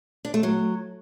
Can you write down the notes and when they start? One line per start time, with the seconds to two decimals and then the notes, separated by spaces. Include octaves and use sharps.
0.25 D4
0.34 A3
0.43 F#3